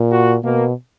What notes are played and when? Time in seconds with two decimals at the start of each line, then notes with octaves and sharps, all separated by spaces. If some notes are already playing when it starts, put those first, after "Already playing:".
Already playing: A#2
0.12 F#4
0.44 B2 A#3